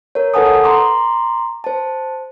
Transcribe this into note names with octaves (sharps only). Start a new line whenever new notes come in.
A#4 C#5
A4 B4 F#5 G#5 A5 D#6
A#5 C6 D6
C5 A5